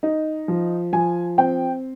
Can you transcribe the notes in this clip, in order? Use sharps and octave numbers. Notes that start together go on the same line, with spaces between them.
D#4
F3
F3 G#5
C4 G5